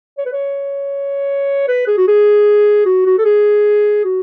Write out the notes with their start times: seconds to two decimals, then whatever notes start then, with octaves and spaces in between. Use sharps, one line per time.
0.18 C#5
0.26 B4
0.33 C#5
1.68 B4
1.87 G#4
1.97 F#4
2.08 G#4
2.86 F#4
3.06 F#4
3.18 A4
3.25 G#4
4.04 F#4